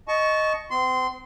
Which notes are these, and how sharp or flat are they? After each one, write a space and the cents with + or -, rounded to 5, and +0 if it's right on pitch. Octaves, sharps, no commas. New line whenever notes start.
D#5 +0 A5 -25 C#6 +5
C4 -40 C6 -15